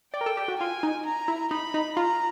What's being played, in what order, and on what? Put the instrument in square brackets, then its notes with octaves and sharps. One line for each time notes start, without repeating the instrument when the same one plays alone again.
[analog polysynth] D5 [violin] G5
[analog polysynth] A#4
A4
G4
F#4
[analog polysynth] F4 [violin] G#5
[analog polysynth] D#4
[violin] A#5
[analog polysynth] E4
[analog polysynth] D#4 [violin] B5
[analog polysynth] D#4
[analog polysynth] F4 [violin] A#5